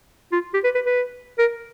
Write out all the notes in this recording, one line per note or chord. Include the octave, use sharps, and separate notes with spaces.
F4
G4
B4
B4
B4
A#4